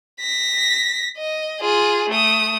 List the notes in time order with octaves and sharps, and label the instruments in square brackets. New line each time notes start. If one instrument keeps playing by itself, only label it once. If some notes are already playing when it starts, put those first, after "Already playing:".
[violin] A#6 B6
D#5
F4 G#4
A3 D#6